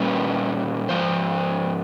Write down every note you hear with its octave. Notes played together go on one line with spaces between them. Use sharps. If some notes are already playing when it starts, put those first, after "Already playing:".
Already playing: A#2 G3 A#3 C#4 B4
G#2 F3 C5